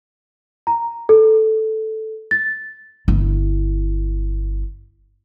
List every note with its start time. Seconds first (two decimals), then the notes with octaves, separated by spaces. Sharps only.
0.67 A#5
1.09 A4
2.31 A6
3.08 G1 E4